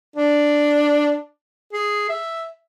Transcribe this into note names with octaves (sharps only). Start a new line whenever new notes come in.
D4
G#4
E5